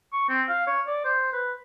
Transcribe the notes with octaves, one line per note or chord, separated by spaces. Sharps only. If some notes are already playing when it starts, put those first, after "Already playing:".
C#6
C4
F5
C#5
D5
C5
B4